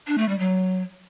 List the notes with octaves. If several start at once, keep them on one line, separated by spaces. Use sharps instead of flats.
D4
A3
G3
F#3